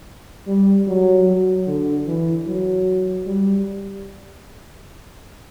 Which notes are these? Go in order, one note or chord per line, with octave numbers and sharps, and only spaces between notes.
G3
F#3
F#3
D3
E3
F#3
G3